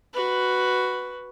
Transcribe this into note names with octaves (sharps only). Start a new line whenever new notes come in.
F#4 B4